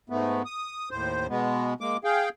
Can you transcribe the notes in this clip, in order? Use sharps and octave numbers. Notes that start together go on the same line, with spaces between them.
G#2 A3 B3
D#6
D#2 A2 C5
B2 G#3 B3
G#3 A#3 D6
G#4 F5 G5